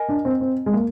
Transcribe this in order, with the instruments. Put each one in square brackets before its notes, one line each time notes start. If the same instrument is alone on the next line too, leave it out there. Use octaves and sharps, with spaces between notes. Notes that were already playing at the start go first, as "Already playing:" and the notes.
Already playing: [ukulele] A#4 D#5 G#5
[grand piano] D4
C4
C4
G#3
A#3